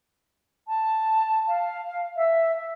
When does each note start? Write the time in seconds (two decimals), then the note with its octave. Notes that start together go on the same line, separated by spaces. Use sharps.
0.68 A5
1.48 F5
2.17 E5